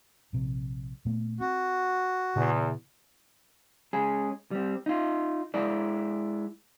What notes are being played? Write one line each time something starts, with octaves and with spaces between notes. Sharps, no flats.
A#1 C3
A#2 A3 B3
C4 F#4
E2 A#2 C#3
G#3 C#4 G#4
G3 C4
D#4 F4
G#3 E4 D5